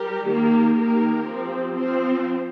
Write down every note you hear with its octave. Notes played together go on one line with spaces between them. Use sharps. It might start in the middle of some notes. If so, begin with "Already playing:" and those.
Already playing: G3 G4 A#4
D#3 A#3 G4 A#4
D#3 A#3 G4 A#4
F3 C4 G4
F3 C4 F4 C5